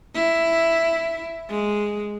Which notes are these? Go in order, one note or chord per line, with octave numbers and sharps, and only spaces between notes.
E4
G#3